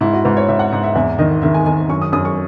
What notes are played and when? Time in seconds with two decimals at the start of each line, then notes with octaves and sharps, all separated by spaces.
0.01 G#2 E4
0.13 F#4
0.24 G#2 B4
0.37 C#5
0.49 G#2 E5
0.59 F#5
0.72 G#2
0.83 E5
0.96 E2 E5
1.19 D#3 D#5
1.42 D#3 E5
1.54 G#5
1.66 D#3 G#5
1.89 F#2 C#6
2.02 D#6
2.12 F#2 D#6
2.25 C#6